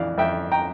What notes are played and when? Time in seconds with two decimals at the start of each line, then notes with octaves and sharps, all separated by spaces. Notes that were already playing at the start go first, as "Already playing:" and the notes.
Already playing: F2 E3 D5 F5
0.18 F2 E5 G5
0.52 G5 A#5